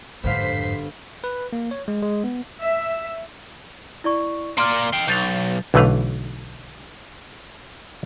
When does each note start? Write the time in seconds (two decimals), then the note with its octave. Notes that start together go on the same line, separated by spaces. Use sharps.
0.24 G1 F2 G#2 C5 F5 B6 C7
1.24 B4
1.53 A#3
1.71 C#5
1.88 G#3
2.02 G#3
2.24 B3
2.63 E5
4.04 E4 D5 C#6
4.58 A#3 D5 C6 F6
4.93 F5 G5
5.08 B1 G6 A6 F7
5.74 B1 D3 E3 A3 B4 F5